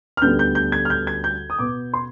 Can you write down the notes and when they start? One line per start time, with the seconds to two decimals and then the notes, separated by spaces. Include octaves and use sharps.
0.17 F6
0.22 D2 D3 G3 B3 G6
0.39 G6
0.55 G6
0.72 G#6
0.85 F6
0.90 G6
1.07 G#6
1.24 G6
1.50 D#6
1.59 B2 B3 D6
1.94 C6